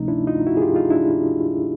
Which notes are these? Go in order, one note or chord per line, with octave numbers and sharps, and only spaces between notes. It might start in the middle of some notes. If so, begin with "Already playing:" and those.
Already playing: D2 C3 F3 A3 C#4 D#4
D4 E4
D#4 F4
E4 F#4
G#4
F4 G4
D#4 F4
D4 E4